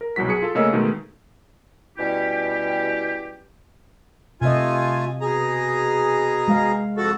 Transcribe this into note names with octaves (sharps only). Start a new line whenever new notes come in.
A#4
C2 B2 F#3 F#4 B6
G#4 C#7
F4 A4
C#3 A3 A#3 C#4 D#5 E6
B2 D#3 G#3 A3
B2 G3 C#4 E4 G4
C3 A3 F4 D#5 G#5
B2 G#4 A#5
G#3 F5
F2 F#4 A4